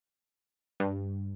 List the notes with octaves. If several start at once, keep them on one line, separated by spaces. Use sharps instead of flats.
G2